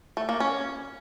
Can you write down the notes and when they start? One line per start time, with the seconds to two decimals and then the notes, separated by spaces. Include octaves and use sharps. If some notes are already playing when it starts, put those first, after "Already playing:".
0.17 A3
0.29 A#3
0.40 C#4